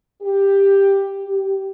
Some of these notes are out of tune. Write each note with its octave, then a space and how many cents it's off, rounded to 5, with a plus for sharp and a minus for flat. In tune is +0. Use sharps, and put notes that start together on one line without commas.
G4 +10
G4 -15